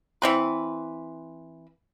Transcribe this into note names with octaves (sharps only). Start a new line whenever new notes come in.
E3 C4 B4